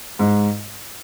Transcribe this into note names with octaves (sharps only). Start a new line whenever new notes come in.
G#2